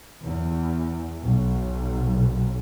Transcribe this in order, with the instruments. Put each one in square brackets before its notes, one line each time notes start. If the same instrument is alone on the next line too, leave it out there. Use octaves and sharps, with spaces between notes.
[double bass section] E2
B1